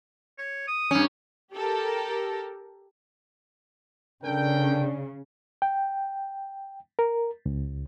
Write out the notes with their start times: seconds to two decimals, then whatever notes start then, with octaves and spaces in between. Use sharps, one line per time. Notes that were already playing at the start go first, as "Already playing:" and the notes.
0.38 C#5
0.68 D#6
0.91 G2 C#4
1.54 G4 A4 A#4
4.24 C#3 D4 A4 A#4 D5 G5
5.62 G5
6.99 A#4
7.46 C#2